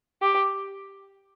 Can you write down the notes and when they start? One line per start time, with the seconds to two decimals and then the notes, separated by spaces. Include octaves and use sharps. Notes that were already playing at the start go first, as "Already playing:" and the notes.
0.22 G4